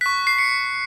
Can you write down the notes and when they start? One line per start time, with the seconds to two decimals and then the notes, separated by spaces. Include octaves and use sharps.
0.01 C#6 F#6 B6
0.27 C7
0.39 C#7